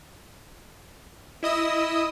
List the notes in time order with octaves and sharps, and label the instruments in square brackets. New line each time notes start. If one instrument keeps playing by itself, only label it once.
[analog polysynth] E4 D#5 D#6 E6